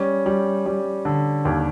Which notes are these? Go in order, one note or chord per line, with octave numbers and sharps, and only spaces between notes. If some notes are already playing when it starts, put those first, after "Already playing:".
Already playing: G3 C#4
G3
G3
D3
D#2